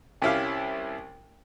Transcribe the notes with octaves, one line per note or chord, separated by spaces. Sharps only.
C2 C#4 E4 G4 F5